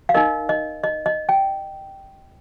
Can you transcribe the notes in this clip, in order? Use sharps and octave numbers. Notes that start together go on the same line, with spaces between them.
F5
D#4 A#4 D#5
D#5
D#5
D#5
G5